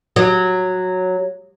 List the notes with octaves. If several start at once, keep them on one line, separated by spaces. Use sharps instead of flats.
F#3